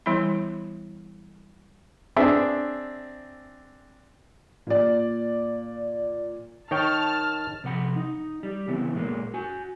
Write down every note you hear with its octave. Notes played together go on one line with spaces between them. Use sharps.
E3 G3 B3 E4 B5
C4 D4 G#4 E5
A#2 D5
D#3 C#5 G5 A5 F6
C3 F3 F#5 B5
D#4
G3
C#3 E3 B3 C4
A#2 G#3 A#3
F#4 G#5